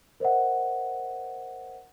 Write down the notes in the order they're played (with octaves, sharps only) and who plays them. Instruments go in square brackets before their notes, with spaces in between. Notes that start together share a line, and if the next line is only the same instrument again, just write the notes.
[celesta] A#4 C5 D#5 E5 F#5